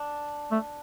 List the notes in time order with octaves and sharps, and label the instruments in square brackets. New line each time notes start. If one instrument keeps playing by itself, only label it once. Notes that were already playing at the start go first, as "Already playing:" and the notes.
Already playing: [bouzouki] D4
[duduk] A3